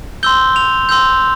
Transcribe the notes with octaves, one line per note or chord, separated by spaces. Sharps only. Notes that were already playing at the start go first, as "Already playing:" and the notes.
C6 E6 G6 G7
F7
C6 E6 G6